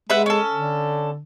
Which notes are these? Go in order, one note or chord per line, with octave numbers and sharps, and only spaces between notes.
G#3 B4 E5 F#5
C#4 A4
D3